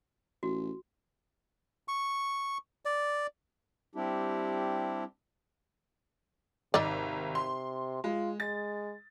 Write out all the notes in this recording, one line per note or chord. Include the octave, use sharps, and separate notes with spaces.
A1 F#4
C#6
D5
G3 C4 D4 E4 G4
G#1 C3 D#4 D5
C6
G#3 F4
G#3 A6